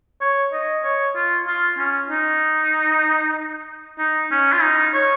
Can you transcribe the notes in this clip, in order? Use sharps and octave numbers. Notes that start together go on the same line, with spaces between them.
C#5
D#5
C#5
F4
F4
C#4
D#4
D#4
C#4
F4
D#4
C#5